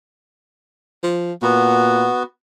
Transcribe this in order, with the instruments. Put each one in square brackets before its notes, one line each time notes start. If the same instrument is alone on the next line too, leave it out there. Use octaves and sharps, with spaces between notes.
[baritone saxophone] F3
[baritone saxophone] A#2 [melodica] B3 F#4